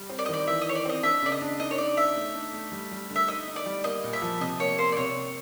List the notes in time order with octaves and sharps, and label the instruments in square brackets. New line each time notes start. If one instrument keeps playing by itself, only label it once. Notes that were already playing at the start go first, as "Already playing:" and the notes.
Already playing: [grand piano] G3
C4
[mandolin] D5
D#5
[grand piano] D#3 [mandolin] D5
[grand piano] E3 [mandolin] E5
[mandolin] D#5
[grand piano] E3 [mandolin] C#5
[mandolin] D5
[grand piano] C4 [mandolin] D#5
[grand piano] D4 [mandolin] E5
[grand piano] C#3 [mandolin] D5
[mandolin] D#5
[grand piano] D4
[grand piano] D#4 [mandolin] D#5
[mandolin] C#5
[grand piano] D#4 [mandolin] D5
[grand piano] D#4 [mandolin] E5
[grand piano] A3
D4
A3
G3
G3
D3
[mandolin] E5
[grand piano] D#4 [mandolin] D#5
[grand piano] D#4
[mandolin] D5
[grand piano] G3
[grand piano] A#3 [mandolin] D#5
[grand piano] A#2
[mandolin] E5
[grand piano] F3
[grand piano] C3 [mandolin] D#5
[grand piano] A#3 [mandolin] C#5
[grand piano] A#3 [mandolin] C5
[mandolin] D5
[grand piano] C3 [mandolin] C#5
[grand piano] C3